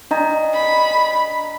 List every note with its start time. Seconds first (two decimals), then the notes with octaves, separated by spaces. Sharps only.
0.11 D4 D#5 A#5
0.55 B5